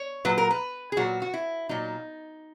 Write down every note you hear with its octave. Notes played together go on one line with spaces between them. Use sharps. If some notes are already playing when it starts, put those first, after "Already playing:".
Already playing: C#5
A#2 F#3 B4
A#4
B4
G#4
A#2 F#3 F#4
F#4
E4
A#2 F#3 D#4